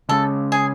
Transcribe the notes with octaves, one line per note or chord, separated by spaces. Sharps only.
C#3 G#3 C#4 A4
G#4